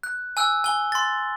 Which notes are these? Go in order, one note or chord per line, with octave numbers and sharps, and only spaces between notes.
F#6
G#5 E6 F#6
G#5 G7
C6 A6